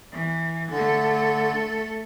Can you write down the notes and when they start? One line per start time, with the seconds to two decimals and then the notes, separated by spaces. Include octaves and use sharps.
0.12 E3
0.71 D3 A3 A4